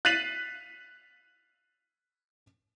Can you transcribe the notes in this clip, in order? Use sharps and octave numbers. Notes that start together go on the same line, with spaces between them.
F#6 A6 B6 C7 D#7 F#7